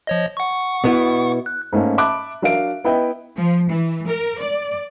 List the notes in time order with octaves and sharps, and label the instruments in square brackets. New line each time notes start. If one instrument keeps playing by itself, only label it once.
[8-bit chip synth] F3 C#5 D#5
F#5 C#6
[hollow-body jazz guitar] B2 B3 E4
[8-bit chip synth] F#6
[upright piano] G#2 A3 A#3 C#4
E5 A5 B5 D6 F#6
F#3 D4 A#4 E5 F5 D7
B3 E4 B4 D#5 E5 G5
[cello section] F3
E3
A#4
D5